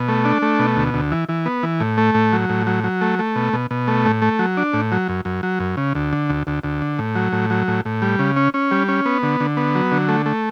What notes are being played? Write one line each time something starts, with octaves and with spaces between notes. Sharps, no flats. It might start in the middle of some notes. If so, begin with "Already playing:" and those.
Already playing: B2
A3
D4
A3
B2
D2
D2
E3
E3
B3
E3
A2
A3
A2
F#3
A2
F#3
F#3
A3
A3
B2
B2
B2
A3
A2
A3
F#3
D4
A2
F#3
F#2
F#2
F#3
F#2
C#3
D2
D3
D2
D2
D2
D3
A2
F#3
A2
F#3
A2
A2
G3
C#3
C#4
C#4
G3
C#4
B3
D3
D3
B3
F#3
D3
A3
A3